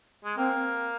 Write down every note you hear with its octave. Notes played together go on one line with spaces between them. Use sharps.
G#3
A#3 C4